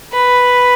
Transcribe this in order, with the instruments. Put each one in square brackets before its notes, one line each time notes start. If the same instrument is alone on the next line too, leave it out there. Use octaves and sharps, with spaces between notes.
[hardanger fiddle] B4